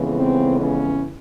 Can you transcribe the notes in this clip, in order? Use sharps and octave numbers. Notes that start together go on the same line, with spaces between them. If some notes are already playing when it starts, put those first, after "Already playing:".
Already playing: F2 C#3 E3 G#3 B3
C4
C#4